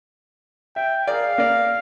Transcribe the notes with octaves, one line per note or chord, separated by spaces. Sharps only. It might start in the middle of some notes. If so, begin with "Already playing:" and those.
E5 G5
G#4 A#4 D5 F5
A#3 D5